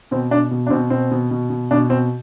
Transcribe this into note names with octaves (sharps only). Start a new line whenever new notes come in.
B2 C4
B2 D4
B2
D4
B2 C4
B2 C4
B2
B2
B2
B2 D4
B2 C4